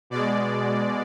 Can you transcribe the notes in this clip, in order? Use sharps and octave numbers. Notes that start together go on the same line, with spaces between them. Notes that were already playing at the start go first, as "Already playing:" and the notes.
B2 G#3 D5